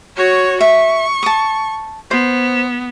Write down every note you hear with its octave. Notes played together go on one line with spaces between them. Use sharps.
F#4 C#5
E5 C#6
A5 D#6
B3 C5